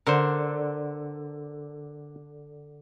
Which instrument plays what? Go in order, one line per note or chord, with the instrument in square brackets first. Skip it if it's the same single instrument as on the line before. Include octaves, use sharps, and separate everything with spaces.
[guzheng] D3 [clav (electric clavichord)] A#4 C5